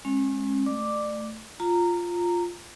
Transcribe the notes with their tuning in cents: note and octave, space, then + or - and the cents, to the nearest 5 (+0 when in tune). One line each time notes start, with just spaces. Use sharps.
G#3 +0 C#4 -40
A3 +0 D5 +25 D6 +0
F4 +0 A#5 -15